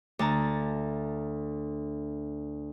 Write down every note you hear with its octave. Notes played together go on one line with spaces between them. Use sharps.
D2 A5 A#5